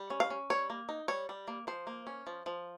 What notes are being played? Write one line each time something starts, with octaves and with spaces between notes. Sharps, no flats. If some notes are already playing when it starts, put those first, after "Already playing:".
Already playing: G3
C#4
F5
C#4
G3 C#5
A#3
D#4
G3 C#5
G3
A#3
F3 C5
A#3
C#4
F3
F3